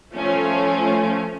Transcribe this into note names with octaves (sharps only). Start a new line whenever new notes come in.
F3 A3 C#4